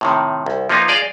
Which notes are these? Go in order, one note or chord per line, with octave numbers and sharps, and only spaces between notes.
A2 C3 D#3
C2
F3 A#3 B3 D#4 F4
G#4 D5 D#5 F5